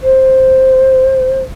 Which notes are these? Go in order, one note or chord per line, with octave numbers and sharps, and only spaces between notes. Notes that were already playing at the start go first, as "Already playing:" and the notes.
C5